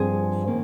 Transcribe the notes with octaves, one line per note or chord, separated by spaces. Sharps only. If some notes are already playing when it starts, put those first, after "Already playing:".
Already playing: G2 F3 C4 G#4 C5
D#3 A#3 C#4